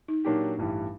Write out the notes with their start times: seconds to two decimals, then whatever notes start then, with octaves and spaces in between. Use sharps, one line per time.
0.08 D#4
0.25 A#2 F#3 A#3 D4 D#4 G4
0.58 A1 G2 E3 G3